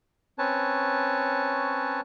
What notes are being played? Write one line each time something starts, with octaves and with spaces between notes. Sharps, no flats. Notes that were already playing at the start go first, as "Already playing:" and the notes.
C4 C#4 B4 C#5 A5